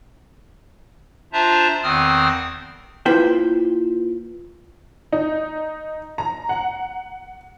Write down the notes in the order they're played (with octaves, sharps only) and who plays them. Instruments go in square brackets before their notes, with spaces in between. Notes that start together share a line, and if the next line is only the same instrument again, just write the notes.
[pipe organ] D4 F4 C5 E5 A5 A#5
E2 D#3 C4 D#6 F6
[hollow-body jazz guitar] A#3 E4 F4 B4 C5 G5
[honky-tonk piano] D#4
A#5
F#5